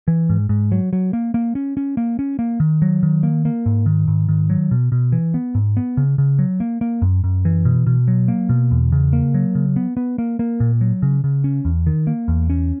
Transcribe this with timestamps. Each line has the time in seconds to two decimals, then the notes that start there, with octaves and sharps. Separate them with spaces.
0.08 E3
0.29 G#2
0.49 G#2
0.72 F#3
0.93 F#3
1.13 A#3
1.34 A#3
1.55 C#4
1.77 C#4
1.97 A#3
2.19 C#4
2.39 A#3
2.60 D#3
2.82 F#3
3.03 D#3
3.23 A#3
3.45 A#3
3.66 G#2
3.86 D#3
4.08 G#2
4.29 D#3
4.50 F#3
4.71 B2
4.92 B2
5.12 E3
5.34 B3
5.55 G#2
5.77 B3
5.97 C#3
6.18 C#3
6.39 F#3
6.60 A#3
6.81 A#3
7.02 F#2
7.24 F#2
7.45 E3
7.65 B2
7.87 B2
8.08 F#3
8.28 A#3
8.49 B2
8.71 E2
8.92 C#3
9.13 A#3
9.34 F#3
9.55 C#3
9.76 B3
9.97 B3
10.18 A#3
10.39 A#3
10.60 A#2
10.81 F#3
11.02 C#3
11.24 C#3
11.44 C#4
11.65 E2
11.87 D#3
12.07 A#3
12.28 E2
12.50 C#4